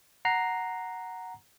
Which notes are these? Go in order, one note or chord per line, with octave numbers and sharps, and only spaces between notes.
F#5 A#5 C7